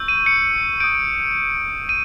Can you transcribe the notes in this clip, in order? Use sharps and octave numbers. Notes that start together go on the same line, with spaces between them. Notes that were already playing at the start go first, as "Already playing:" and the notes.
Already playing: C#6 E6 G6
D#7
C#7
D#6 G6 D7
D#7